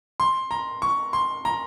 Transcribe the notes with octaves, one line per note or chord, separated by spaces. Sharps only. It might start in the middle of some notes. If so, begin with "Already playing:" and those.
C6
A#5
C#6
C6
A#5